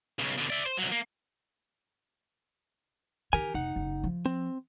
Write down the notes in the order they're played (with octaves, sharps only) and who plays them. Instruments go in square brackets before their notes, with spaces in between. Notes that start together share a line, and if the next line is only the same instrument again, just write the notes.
[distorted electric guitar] B1 C#3
B2 D3
D5 E5
C5
C2 F#3
A#3
[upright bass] D#3 [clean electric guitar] G4 A#4 G#5
[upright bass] F1 [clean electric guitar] D#4 F#5
[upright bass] F#1
F3
[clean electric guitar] C4